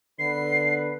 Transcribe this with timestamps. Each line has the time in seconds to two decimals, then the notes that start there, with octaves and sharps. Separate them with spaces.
0.19 D3 B3 B4 C7